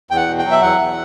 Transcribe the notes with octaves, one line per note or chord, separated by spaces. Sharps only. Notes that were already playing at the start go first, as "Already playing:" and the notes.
E2 G5
F#5
B2
G5
F#3
E5
E2 F#5
E2